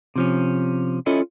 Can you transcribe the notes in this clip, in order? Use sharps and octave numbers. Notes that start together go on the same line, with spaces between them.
C3 F3 C#4
C#4 E4 F4 A4 C#5 D#5